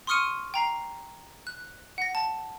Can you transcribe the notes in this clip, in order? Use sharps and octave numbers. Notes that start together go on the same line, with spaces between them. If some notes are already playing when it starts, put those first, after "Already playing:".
C6 C#6 D#6 F6 C#7 D#7
G5 A#5 C7
F#6
F#5 A#6
A5